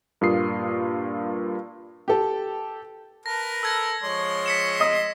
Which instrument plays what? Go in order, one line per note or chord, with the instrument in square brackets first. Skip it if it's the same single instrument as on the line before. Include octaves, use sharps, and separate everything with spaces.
[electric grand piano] G2 A#2 A#3 F4 D#6 C7
[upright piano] G4 A4
[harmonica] A#4 B4 [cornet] A5 [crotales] A#6
[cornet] A4 [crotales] E6 G#6 A#6
[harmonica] F3 G#3 C6 [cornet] C#5
[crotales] B6 C#7 E7
[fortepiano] D#5 D#6